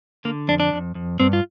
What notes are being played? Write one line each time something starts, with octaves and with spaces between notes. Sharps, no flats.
D3 A#3
F2 D4
D4
F2
F2
G2 C4
F4